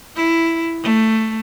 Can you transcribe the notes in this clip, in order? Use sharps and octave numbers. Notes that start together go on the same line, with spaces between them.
E4
A3